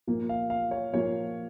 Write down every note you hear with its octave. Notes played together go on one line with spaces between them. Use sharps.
A#2 F3 A#3
F5
F5
C#5
A#2 F3 A#3 C#5